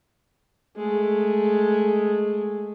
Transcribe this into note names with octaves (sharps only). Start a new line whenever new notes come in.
G#3 A3